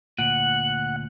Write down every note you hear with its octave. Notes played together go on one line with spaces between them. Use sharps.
D2 A#2 F#5 F#7